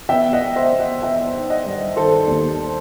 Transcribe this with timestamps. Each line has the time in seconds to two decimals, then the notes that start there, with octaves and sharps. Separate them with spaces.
0.09 B3 E5 G5
0.33 D#5 F#5
0.41 B3
0.56 C5 E5
0.72 B3
0.79 D#5 F#5
1.03 B3 E5 G5
1.34 D#4
1.50 D#5 F#5
1.66 G2
1.96 D#3 A4 C5
2.28 D#2